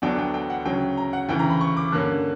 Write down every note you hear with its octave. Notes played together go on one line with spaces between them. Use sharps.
D2 D3 F#3 B3 D4 G5
G5
G5
F#5
D2 C#3 F#3 C#4 G5
A#5
F#5
D2 C#3 E3 G5
A#5
B5
C#6
D6
G2 D3 A#3 C#4 F#6